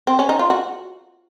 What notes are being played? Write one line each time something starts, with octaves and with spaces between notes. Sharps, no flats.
C4
C#4
D#4
F4
F#4